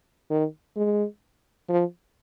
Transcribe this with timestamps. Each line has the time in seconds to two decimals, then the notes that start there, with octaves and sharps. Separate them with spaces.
0.30 D#3
0.76 G#3
1.69 F3